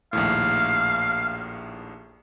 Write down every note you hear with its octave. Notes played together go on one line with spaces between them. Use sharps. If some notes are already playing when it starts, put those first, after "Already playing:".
A#1 D#2 A2 F5